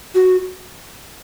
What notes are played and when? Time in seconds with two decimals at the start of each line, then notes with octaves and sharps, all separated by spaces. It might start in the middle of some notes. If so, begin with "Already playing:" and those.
0.15 F#4